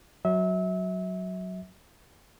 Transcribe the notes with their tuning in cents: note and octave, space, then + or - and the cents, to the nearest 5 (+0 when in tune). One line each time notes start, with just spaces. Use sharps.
F#3 +0 E5 -30